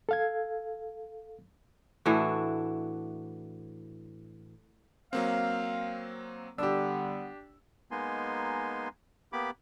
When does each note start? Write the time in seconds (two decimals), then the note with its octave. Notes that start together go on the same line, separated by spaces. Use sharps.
0.09 A4 F5 G#6
2.06 A2 E3 D4 F#4
5.13 F#3 A#3 C4 F5
6.58 D3 G3 B3 D4 G4 E6
7.91 G#3 A#3 B3 D#4 G#5 C6
9.33 A#3 B3 G4 B5 D6